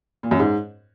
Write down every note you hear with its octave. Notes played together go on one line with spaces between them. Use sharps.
A#2
F#2
G#2